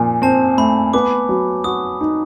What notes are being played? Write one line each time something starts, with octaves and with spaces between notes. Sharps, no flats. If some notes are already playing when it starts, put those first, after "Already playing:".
Already playing: A#2 F3 G#5
C4 A5
A3 B5
B3 D6
F#3
F#4 D#6
D#4